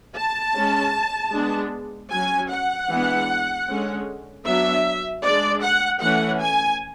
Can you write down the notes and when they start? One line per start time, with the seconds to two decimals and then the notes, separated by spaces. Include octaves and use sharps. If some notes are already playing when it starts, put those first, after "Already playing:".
0.17 A5
0.56 G#3 C#4
1.33 G#3 B3 D4
2.12 F#3 C#4 G#5
2.51 F#5
2.90 E3 G#3 B3 D4
3.68 D3 G#3 C#4
4.46 F#3 B3 D4 E5
5.24 G#3 D4 D5
5.63 F#5
6.02 E3 A3 C#4 F#5
6.41 G#5